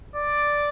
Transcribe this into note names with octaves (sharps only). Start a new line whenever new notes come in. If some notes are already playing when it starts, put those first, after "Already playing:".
D5